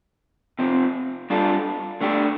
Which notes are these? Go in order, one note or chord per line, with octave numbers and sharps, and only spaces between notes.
C3 F3 C4
G3 D4 F4 A4
D3 A3 D4 G4